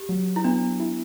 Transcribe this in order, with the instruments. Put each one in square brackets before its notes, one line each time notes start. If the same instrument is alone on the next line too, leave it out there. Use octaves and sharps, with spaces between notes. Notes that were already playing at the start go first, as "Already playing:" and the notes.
Already playing: [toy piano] G4
[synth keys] F#3
[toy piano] E4
[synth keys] B3 [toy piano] D4
[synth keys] E4